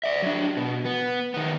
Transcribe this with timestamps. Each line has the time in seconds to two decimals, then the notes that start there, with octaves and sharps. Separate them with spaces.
0.04 D5 E5
0.22 F#3 D4
0.57 B2
0.85 B3
1.34 D#3 B3